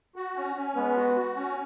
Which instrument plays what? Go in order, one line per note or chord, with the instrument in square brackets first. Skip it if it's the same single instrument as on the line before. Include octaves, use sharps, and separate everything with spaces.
[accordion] F#4
C#4
C#4
[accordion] G#3 [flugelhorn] B3
[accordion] F#4
F#4
C#4